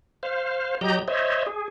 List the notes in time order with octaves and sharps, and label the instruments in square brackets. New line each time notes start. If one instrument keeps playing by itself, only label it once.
[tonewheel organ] C5 F5
F#3 G4 D#5 A#5 G6
C5 C#5 D#5 E5
G#4